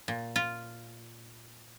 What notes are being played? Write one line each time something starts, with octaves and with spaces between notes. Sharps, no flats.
A#2
F4